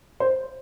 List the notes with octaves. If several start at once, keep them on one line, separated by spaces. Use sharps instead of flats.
C5